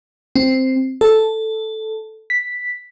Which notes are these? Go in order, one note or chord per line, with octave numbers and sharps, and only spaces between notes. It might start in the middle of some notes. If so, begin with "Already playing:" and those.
C4
A4
B6